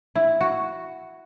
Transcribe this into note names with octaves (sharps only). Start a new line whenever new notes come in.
E4
F#4